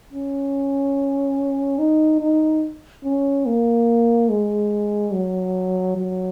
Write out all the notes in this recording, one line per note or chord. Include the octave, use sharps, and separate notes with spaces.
C#4
D#4
D#4
C#4
A#3
G#3
F#3
F#3